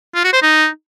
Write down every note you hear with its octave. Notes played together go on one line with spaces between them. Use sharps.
F4
F#4
C5
D#4